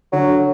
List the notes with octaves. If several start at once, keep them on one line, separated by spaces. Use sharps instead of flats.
D3 F#3